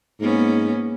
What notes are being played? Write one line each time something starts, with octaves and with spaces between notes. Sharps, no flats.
G#2 A#3 B3 C#4